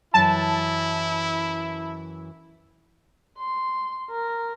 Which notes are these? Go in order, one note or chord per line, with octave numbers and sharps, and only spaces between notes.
F#2 E3 E4 A5
C6
A#4